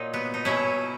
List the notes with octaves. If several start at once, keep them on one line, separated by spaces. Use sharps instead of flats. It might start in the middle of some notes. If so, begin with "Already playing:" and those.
Already playing: A#2 F#3 D#4
B3
D#4
B2 F#3 C#4 E4